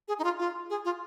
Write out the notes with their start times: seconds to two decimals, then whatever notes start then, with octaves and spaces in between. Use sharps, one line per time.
0.08 G#4
0.19 D#4
0.24 F4
0.39 F4
0.70 G#4
0.85 F4